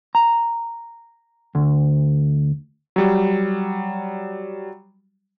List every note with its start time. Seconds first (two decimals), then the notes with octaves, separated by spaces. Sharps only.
0.15 A#5
1.55 D2
2.96 F#3 G3